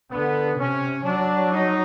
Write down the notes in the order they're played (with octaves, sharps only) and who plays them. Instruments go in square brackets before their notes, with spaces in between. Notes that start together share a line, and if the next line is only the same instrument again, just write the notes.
[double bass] D3 [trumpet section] B3
[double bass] C3 [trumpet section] C#4
[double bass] F#3 [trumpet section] D4
[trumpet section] D#4